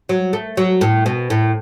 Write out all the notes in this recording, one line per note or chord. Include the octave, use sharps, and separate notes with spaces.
F#3
A3
F#3
A2
B2
A2